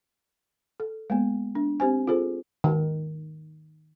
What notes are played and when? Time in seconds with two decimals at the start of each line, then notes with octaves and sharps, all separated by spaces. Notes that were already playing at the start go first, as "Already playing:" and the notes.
0.80 A4
1.10 G#3 A#3 B3
1.55 D4
1.80 C4 G4 C5 G#5
2.07 F4 G#4 A4 C5
2.64 D#3